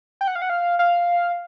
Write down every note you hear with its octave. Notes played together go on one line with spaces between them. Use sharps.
G5
F#5
F5
F#5
F5
F5